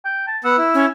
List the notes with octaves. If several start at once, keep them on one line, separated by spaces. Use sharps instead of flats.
G5
A5
B3 F#5 E6
E4
C#4